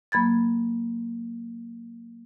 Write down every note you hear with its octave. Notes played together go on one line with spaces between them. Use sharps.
F#3 A#3 B5 G#6 A6